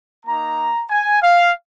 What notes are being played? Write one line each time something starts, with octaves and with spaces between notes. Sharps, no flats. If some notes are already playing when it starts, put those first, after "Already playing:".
A#3 D#4 A#5
G#5
F5